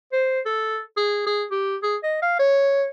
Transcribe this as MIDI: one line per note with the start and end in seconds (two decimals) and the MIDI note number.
0.13 0.40 72
0.45 0.80 69
0.97 1.25 68
1.27 1.45 68
1.51 1.76 67
1.83 1.96 68
2.03 2.19 75
2.22 2.38 77
2.39 2.88 73